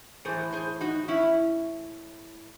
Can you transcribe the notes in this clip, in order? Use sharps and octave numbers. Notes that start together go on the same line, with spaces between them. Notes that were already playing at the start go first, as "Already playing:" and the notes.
A2 E3 G#4 C5
G#4 C5
D#4 F#4
C#4 E4